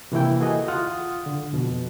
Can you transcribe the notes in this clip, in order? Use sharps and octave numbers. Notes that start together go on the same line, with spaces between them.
C3 E3 A#3 E4 G5
F#4 G#4 A4 D#5
F4 F#5 D#6 F6
D3
F2 B2